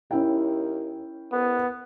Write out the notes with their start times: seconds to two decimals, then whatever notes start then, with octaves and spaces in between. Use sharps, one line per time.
0.11 D#2 C#4 E4 G5
1.32 C2 B3